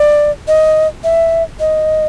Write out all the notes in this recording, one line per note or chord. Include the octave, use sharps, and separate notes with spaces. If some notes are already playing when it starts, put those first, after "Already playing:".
Already playing: D5
D#5
E5
D#5